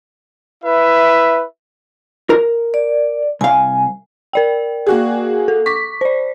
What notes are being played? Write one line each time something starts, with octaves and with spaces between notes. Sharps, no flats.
E4 B4 E5
A#4
D5
C2 F5 G#5
A#4 D5 G5
A#3 F#4 G#4
A4
C#6 D6 B6
C5 D5